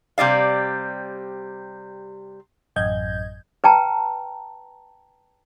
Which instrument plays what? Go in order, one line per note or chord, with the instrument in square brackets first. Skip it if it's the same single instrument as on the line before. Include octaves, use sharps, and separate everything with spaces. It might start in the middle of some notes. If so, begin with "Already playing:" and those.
[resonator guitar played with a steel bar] C3 G3 D5 F5
[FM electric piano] A1 F#2 D#5 G6 G#6
[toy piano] B4 G5 A5 A#5